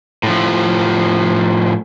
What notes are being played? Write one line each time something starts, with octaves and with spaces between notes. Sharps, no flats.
A2 F3